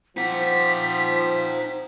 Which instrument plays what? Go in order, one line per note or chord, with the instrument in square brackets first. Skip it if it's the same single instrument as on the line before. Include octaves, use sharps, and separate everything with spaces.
[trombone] F3 [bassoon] C4 [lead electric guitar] D#4 F#5 [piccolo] B6